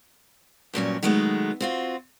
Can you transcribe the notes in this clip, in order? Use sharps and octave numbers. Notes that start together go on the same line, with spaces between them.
G2 A#2 F#3 C#4
D#3 F#3 G#3 A3 B3
C4 F4 F#4